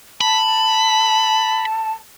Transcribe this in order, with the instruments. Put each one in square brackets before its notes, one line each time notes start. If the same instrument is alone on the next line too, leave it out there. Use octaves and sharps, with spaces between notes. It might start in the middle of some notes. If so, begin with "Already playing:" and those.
[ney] A5 [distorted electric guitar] B5